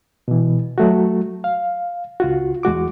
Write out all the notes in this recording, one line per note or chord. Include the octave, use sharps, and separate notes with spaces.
B2 E3
F#3 A3 F#4
F5
C#2 F4 F#4
E2 G#3 F#4 D6